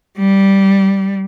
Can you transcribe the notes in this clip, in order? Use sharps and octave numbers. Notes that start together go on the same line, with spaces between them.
G3